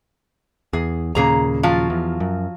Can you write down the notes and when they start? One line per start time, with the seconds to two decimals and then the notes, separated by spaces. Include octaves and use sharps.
0.73 E2 G#4
1.15 D#2 A#2 C#3 A#3 G#4 A#5
1.63 F3 F#3 F4
1.90 E2
2.20 F#2